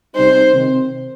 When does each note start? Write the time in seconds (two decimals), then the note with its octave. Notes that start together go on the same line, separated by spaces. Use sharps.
0.15 C2 C3 G3 D#4 C5
0.53 C3 D#3 C4